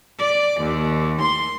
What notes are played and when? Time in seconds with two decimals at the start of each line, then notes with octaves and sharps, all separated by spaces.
0.20 D5
0.61 D#2
1.21 C6